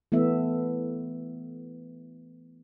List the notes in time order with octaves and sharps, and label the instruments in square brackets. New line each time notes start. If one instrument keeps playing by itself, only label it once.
[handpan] E3 A3 B3 E5